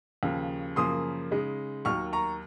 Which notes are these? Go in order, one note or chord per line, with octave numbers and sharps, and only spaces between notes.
D#2 C#3 F3
F#2 C#3 F3 A#3 C6 D#6
C#3 G#3 D#4
D#2 D#3 F#3 C#6 F6
A#5 C#6